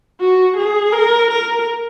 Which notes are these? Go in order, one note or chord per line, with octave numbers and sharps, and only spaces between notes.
F#4
G#4
A#4
A#4